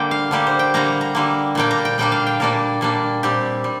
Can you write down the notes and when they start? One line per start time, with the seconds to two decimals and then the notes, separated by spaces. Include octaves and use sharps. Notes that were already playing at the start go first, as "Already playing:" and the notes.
Already playing: D3 G3 A#3 G5
0.11 F5
0.31 D3 G3 A#3 G4
0.47 C5
0.59 G5
0.74 D3 G3 A#3 A#5
1.01 A#5
1.15 D3 G3 A#3
1.55 A#2 G3 A#3 D4 G5
1.71 A#5
1.85 G5
1.98 A#2 G3 A#3 D4 G5
2.12 F5
2.27 G5
2.40 A#2 G3 A#3 D4 A#4
2.81 A#2 G3 A#3 D4
3.23 A#2 G3 C4 G4
3.64 G3